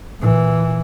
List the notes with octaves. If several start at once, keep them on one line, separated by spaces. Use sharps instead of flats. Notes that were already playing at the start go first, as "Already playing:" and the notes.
A#2 E3